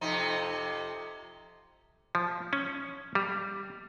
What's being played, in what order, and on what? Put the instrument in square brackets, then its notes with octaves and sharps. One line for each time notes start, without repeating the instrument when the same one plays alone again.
[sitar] F2 C3 D#4
[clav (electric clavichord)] F3
C#4
G3